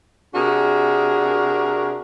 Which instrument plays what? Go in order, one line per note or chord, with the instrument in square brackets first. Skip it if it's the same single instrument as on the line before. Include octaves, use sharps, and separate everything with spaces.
[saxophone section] C3 D4 F#4 G#4 A#4